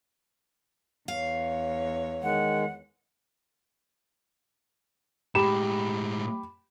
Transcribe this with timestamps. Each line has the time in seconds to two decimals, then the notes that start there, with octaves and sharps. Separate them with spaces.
1.08 E2 C#5 F5
2.23 D#3 G#3 F#5
5.35 A2 G#3 G4 B5 E7